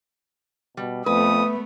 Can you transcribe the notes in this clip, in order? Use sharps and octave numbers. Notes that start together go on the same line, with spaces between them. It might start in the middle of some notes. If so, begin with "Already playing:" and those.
B2 G3
F2 A3 B3 B4 D#6